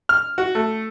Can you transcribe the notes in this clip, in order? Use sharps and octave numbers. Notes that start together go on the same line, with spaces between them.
F6
F#4
A3